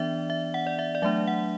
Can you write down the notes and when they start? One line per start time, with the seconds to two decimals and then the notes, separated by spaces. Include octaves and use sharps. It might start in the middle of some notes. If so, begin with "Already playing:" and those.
Already playing: E3 B3 D4 D5 E5
0.30 E5
0.54 F#5
0.67 D5
0.79 E5
0.95 D5
1.02 F#3 A3 D4 E5
1.27 F#5